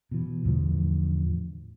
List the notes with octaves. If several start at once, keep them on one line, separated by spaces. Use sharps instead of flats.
B2 E3
E2 A2 D3 F3